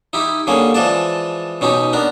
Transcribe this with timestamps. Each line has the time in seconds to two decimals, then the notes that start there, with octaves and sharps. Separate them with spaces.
0.13 D#4 E4 G4
0.47 D3 G3 A#3 C#4 G#4
0.74 E3 F3 G#3 D5 A5
1.61 B2 C#4 D#4 G4
1.93 B3 D4 A#4